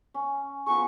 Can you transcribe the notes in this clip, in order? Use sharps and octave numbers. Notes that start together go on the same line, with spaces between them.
C#4
F3 B3 G#4 C#6